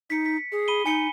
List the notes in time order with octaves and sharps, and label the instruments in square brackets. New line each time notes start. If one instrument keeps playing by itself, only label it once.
[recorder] D#4 [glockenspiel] B6 C#7
[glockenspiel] B6
[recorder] G#4
[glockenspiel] B5 D#7 G7
[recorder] D#4 [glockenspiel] G#5 C#7 G7